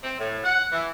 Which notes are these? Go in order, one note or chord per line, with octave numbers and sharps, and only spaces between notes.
C4
A2
F#5
E3